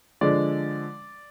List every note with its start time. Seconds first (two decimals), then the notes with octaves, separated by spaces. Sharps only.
0.21 D3 F3 G#3 D5